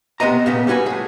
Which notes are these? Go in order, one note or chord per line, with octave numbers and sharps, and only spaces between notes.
C3 B3 C5 D#5 A#5
A#2 C#3 B3
G3 C#4 F#4 B4 G#5
A2 G#4